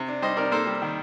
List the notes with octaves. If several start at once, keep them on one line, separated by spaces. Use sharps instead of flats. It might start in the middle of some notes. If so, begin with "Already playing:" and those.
Already playing: C3
D4
G3 C5 D#5
C3 A#4 D5
A#3 A4 C5
G3
D#3